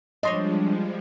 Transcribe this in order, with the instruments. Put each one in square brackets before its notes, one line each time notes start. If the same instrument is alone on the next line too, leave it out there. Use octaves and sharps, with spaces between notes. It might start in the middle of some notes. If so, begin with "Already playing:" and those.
[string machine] F3 G3 G#3 [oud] D4 C5 C#5 [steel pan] D#5 C6